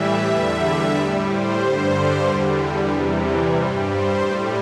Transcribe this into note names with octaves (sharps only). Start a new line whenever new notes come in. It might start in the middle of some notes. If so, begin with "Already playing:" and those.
Already playing: A2 E3 G3 E5
E2 D3 G3 E5
A2 G3 D5
C5
G2 D3 G3 C5
E2 D3 G3
E2 C3 E3 G3
G2 G3 C5
C5
A2 G3 D5